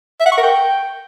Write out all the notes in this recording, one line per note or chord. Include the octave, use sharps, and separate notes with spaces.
E5
F#5
C#6
A#4
G5